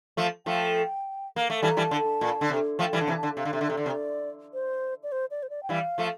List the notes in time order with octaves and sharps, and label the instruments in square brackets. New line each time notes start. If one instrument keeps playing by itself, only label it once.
[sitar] F3 A3
[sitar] F3 A3 [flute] G5
[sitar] A#3
A3
[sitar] E3 G3 [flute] A5
[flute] A#5
[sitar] E3 G3 [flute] A5
[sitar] D3
A#2
D3
C3
[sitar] F3 A3 [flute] G5
[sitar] E3 G3
[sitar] D3 [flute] A5
[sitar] C3 E3
[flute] A5
[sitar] D3
[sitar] C3 [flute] F5
[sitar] D3
C3
[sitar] D3 [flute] E5
[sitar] C3
[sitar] D3 [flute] D5
[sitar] C3
[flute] C5
D5
C5
D5
C5
D5
G5
[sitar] E3 G3 [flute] F5
[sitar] F3 A3